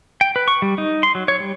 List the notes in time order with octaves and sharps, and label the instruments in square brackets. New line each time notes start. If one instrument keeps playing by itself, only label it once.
[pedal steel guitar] G5
B4
C#6
G3
D#4
C6
F#3
C#5
G3